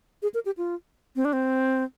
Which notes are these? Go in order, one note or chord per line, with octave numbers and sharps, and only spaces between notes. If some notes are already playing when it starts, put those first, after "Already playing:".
G#4
A#4
G4
F4
C4
D4
C4